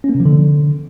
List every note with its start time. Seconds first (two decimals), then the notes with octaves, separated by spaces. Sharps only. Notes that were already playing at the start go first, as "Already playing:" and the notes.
0.04 C#4
0.09 A#3
0.15 C3
0.20 F3
0.25 D3